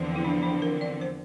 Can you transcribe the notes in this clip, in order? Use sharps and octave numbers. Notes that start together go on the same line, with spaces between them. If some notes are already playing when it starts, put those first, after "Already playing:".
Already playing: E2 D3 F3 C4
E4
D4
D4
A#4
D5
C5